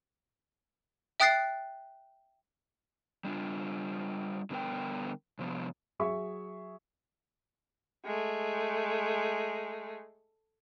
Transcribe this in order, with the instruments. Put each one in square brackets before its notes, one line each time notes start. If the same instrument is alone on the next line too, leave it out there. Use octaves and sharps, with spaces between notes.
[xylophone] E5 G5 D#6 F#6 A6 C7
[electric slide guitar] G3 D4 F4
D3 G3 B3 G#4 A#4 G5
C3 F3 B3
[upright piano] F#3 G#4 E5 C#6
[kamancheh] G#3 A3